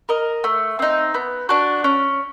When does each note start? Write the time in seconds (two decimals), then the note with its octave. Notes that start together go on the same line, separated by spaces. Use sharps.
0.09 A#4 D#5
0.44 A3
0.79 C4 D#4
1.14 B3
1.49 D4 F#4
1.84 C#4